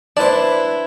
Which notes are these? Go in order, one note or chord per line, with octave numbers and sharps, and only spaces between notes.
D4 E4 B4 C5 D5 A5